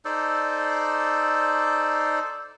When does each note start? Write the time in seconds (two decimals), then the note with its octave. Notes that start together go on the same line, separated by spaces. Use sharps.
0.05 D#4 A4 C5 D5